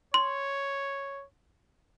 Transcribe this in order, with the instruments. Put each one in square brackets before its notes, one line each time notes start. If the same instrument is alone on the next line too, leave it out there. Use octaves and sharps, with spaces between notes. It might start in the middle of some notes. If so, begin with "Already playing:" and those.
[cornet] C#5 [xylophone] C6